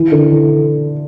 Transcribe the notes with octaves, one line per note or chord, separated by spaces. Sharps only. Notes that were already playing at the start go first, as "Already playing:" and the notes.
Already playing: E3
D3
E3